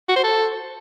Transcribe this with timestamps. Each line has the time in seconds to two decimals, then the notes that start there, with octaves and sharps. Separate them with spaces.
0.09 F#4
0.16 C5
0.24 A4